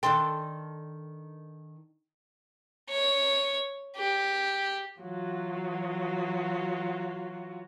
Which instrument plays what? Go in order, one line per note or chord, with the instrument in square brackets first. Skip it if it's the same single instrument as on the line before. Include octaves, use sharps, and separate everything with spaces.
[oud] D#3 D4 A4 [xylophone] G5 C6
[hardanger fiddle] C#5
G4
[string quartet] E3 F#3 F4 F#4